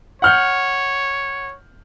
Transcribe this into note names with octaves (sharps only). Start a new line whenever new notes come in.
C#5 F#5 F6 G6